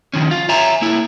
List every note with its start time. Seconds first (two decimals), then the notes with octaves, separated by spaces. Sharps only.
0.14 D#3 F3 C#4
0.31 F4
0.49 C#5 E5 G#5 A#5
0.82 A#3 E4